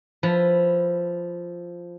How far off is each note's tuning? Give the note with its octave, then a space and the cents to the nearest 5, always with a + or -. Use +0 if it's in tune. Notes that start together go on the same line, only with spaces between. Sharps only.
F3 +0 E4 +10 B4 +0